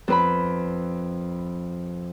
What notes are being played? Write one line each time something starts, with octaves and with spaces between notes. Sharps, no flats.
F2 B4 B5